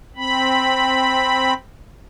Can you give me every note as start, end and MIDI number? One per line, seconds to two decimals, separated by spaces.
0.17 1.54 60
0.17 1.54 83